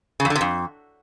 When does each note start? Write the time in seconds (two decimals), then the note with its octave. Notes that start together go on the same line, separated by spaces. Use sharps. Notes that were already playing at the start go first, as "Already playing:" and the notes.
0.20 C#3
0.25 F2
0.30 D3
0.35 C3
0.41 F2